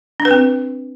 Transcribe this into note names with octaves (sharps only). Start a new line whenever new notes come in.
D4
B4
C4